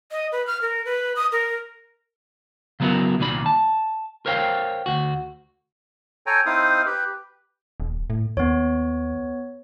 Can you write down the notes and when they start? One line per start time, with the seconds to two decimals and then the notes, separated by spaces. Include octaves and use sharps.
0.11 D#5
0.32 B4
0.47 F6
0.62 A#4
0.85 B4
1.16 D#6
1.32 A#4
2.80 C#3 F#3 B3 E4 F#4 A#4
3.20 C2 A#2 D#3 D5 B5
3.46 A5
4.26 A#4 C5 C#5 F5 G5
4.86 D2 F#4
6.26 A4 C#5 G5 G#5 A#5
6.46 C4 D#4 E4 C5 F5 D#6
6.86 G4 B4
7.80 D#1
8.10 A2
8.37 D#2 B3 C#5